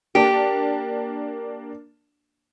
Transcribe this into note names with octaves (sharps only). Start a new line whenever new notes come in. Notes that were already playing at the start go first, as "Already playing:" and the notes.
A#3 D4 G4 A5